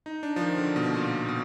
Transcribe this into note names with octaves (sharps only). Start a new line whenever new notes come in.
D#4
D4
F3
D#3
D3
B2
A#2
A#2
B2